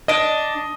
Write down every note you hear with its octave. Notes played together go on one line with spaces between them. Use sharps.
D4 D#5